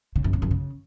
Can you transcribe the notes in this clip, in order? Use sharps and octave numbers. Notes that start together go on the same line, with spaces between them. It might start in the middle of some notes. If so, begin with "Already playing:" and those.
C#3
F#2
C#3
F#2
C#3